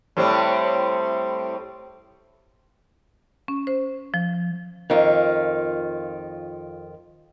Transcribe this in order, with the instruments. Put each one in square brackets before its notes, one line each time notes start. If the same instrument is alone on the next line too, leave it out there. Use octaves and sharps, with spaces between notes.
[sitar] A2 G3 C4
[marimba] C#4
C5
F3
[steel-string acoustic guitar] F2 D#3 F4